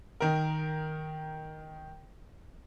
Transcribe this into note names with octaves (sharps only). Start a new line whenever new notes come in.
D#3 A#4